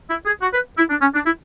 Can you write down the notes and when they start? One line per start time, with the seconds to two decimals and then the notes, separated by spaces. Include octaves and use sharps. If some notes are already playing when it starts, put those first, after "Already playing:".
0.10 E4
0.26 G#4
0.42 F#4
0.54 B4
0.78 E4
0.90 D4
1.02 C#4
1.14 D4
1.26 E4